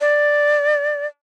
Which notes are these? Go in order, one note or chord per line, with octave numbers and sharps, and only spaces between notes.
D5